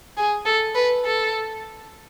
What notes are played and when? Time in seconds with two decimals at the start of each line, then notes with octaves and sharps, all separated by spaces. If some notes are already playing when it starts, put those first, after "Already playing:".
0.17 G#4
0.46 A4
0.75 B4
1.05 A4